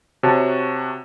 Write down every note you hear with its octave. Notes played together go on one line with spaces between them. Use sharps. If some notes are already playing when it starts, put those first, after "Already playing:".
C3 F#4 C#5 A5